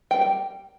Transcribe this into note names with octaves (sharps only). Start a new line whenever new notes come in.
G3 A#3 D4 G5
G5